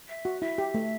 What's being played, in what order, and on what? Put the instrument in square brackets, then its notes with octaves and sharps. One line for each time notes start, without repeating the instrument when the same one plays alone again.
[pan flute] E5
[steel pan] F#4
[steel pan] E4 [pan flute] E5
[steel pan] G4
A3